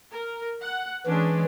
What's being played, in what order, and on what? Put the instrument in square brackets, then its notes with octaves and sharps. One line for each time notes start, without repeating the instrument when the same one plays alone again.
[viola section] A#4
F#5
[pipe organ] E3 [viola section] G#3 C#4 D4